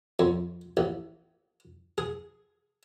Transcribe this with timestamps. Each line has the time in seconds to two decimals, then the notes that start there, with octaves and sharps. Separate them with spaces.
0.19 F2
0.77 A1
1.98 G#4